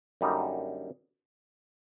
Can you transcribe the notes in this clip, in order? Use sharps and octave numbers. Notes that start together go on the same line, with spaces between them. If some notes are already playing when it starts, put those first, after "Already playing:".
F#2 D3 G3 A#3 D#4